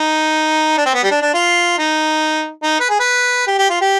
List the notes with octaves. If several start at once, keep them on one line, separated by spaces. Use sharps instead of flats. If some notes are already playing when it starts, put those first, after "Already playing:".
Already playing: D#4
D4
C4
B3
G3
D4
D4
F4
D#4
D#4
B4
G#4
B4
G4
G4
F4
G4